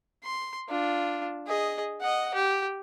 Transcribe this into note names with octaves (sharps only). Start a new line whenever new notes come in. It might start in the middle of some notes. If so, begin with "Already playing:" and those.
C6
D4 F4
G#4 D#5
D#5 F#5
G4